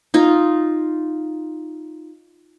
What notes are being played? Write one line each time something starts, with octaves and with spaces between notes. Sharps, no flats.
D#4 F4